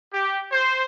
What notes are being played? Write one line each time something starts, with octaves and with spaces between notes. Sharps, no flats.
G4
C5